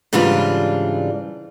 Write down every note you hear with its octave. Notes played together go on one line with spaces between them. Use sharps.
G#2 C#3 E3 G3 D4 F4